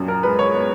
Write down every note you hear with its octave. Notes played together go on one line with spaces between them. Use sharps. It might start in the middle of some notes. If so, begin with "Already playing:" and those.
Already playing: A#1 F#2
A#4
G#3 B4
C#5
B3